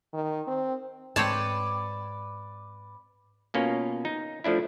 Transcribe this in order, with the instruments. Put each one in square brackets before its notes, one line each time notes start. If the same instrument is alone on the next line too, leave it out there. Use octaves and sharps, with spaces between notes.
[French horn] D#3
C4
[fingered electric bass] G#2 [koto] C4 C#5 A5 [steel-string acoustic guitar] B4 D5
[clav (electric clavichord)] B2 A#3 C#4 F4
D#4
F3 A3 D4 E4